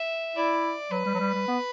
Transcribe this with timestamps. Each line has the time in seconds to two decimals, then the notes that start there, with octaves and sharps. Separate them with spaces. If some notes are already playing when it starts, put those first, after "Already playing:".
Already playing: E5
0.36 E4 D5
0.91 F#3 B4
1.06 G3
1.14 F#3
1.20 G3
1.34 G3
1.48 B3